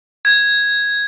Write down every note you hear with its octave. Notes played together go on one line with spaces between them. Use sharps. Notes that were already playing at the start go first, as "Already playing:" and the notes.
G#6